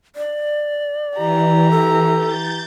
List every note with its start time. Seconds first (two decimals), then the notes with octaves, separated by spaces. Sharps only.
0.16 D5
1.17 E3 G4 A#5
1.71 A4
2.14 G6 A6